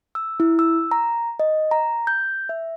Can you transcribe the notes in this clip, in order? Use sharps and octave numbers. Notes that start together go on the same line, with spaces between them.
E6
E4
E6
A#5
D#5
A#5
G6
E5